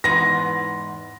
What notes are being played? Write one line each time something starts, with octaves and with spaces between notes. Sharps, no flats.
E2 G#2 B3 A#6